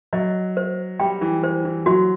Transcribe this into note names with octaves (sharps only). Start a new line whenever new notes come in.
F#3 D#5
C5
G3 G5
E3
C5
E3
F#3 F#4